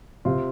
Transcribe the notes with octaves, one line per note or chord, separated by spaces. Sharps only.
C3 F4